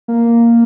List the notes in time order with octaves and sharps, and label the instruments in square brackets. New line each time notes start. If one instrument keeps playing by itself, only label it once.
[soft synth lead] A#3